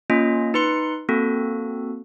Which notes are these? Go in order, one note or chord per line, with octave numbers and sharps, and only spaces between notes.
A#3 C#4 F4 D#5
D#4 B4 C6 C#7
A#3 C4 F#4 A4